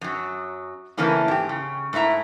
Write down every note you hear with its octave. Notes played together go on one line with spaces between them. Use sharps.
F#2 F#3
C#3 E3 A3 A#3 C#4 E4
G#2 G4
C#3
G#2 A3 E4 E5 A#5